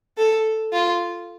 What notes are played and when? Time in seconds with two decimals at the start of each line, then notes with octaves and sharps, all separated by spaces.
0.17 A4
0.73 F4